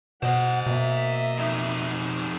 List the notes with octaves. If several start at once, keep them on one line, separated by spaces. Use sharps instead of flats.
B2 C5 D#5 F#5
B2 A#3 E5
F2 D#4